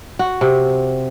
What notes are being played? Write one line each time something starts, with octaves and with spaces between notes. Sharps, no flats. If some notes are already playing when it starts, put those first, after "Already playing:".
F#4
C3